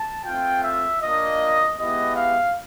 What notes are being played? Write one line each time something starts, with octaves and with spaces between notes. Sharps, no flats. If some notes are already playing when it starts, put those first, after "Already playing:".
Already playing: A5
A3 C4 F4 G5
E5
A#3 D4 F4 D#5
G#3 B3 E4 G4 D#5
F5